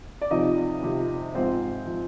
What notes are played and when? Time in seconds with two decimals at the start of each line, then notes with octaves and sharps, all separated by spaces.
0.21 D5
0.31 F2 C3 F3 D#4 D#5
0.83 F2 C3 F3
1.34 G#2 F3 C4 C5
1.87 F3